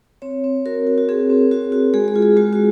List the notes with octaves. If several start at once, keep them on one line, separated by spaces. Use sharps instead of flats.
C4 C#5
C4
F#4 A#4
F#4
F#4
C4 G#4
C4
F#4
F#4
G#3 G#4
G#4
F4
G#4
G#3 F#4
F#4